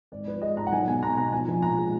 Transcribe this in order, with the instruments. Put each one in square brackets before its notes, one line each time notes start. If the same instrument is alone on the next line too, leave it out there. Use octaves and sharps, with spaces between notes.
[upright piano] G#1 D5
F3 B4
G#3 D#5
G#2 A#5
F#5
B1 G#5
B2 G#5
B2 A#5
B2 A#5
F3 G#5
A#1
A#2 A#5
G#3